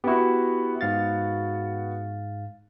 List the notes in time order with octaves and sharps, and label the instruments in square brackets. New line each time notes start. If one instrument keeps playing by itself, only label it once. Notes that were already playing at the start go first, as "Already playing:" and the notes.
[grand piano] B3 F#4 [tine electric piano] E4 G4
[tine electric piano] G#2 F5 A6